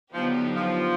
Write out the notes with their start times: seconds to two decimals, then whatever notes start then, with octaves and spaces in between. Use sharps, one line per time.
0.13 D3 F3 F#3 B3 D#4 G4
0.55 F3